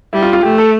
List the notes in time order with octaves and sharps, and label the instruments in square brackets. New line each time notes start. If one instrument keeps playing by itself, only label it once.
[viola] G3 [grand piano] E4
[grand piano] F4
F4
[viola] A3 [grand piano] G4
[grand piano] A4